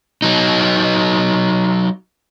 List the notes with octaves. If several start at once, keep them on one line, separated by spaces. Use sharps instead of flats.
F#3 D#4